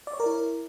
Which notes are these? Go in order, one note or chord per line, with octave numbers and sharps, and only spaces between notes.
D5
C#5
A#4
E4